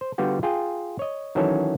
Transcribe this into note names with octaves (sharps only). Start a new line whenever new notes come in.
C5
D3 G3 B3 F4 F#4
F4 G#4 G5
C#5 D#5
D#3 E3 F#3 C#4 A4 C#5